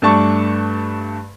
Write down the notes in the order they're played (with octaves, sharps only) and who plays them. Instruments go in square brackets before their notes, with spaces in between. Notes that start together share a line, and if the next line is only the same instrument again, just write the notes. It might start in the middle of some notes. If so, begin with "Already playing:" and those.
[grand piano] G2 A3 D4 A5 C#6